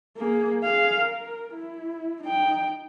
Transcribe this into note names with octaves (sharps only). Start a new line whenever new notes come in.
A#3 G#4
G#4 F5
A#4
E4
D#4 G5